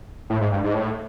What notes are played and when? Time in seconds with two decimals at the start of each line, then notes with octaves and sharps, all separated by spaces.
0.30 A2
0.41 G#2
0.52 G2
0.64 G#2
0.74 A2